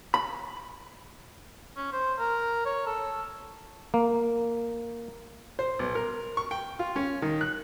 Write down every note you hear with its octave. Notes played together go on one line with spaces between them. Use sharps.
B5
C#4
C5
A#4
C#5
A4
A#3
C5
B1
A#4
C#6
G5
F4
C#4
D#3
F#6